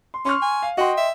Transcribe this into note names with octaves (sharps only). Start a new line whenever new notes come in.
C6
C#4 C6 C#6 F6
G#5
F5
F#4 D#5 G5 C6
E5